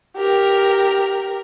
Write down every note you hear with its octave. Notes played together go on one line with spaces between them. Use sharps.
G4 A#4